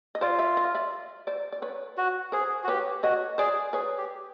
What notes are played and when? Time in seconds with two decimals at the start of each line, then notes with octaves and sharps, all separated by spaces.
0.15 D#5
0.21 F4 C5 D5
0.39 D5 E5
0.57 D#5 F5
0.74 D5 E5
1.27 C5 D5
1.52 D5
1.62 B4 C#5
1.97 F#4
2.32 G#4 A#4 C5
2.64 F#4
2.68 G4 B4 C#5
3.03 F#4 C#5 D#5
3.38 G#4 C5 D5
3.73 G#4 B4 C#5
3.98 G4